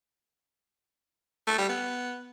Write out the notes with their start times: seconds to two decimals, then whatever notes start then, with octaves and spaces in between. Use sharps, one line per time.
1.47 A3
1.58 G3
1.69 B3